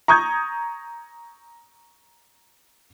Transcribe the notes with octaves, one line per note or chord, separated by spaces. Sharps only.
A#5 C#6 D#6 G6 G#6